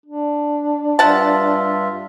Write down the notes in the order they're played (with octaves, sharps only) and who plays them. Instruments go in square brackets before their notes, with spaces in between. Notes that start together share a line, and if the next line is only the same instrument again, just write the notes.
[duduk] D4
[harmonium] G2 F4 E5 [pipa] F#5 A5